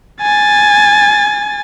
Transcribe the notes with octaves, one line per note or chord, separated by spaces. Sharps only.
G#5 A6